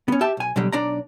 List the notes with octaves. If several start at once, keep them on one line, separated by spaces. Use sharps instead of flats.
B3 C#4
G4 E5 A5
B1 G#5
B2 D3 F#3 G3
B1 D4 D5 A#5